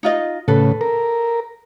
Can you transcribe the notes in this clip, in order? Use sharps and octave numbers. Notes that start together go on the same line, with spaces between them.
D#4 F4 D#5
A2 C#3 A4 B4
A#4